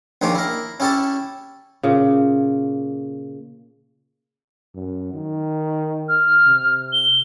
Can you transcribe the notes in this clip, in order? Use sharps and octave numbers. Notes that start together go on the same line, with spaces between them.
A#1 A#2 D#3 F3 C#5 D6
E4 A#4
C#4 E4 G4 A4 C#5 A5
A#2 C#3
F#2
D#3
F6
C3
G7